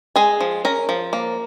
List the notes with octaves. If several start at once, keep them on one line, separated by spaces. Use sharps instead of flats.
G#3 G#4 G#5
F3
C#4 A#4 A#5
F3
A#3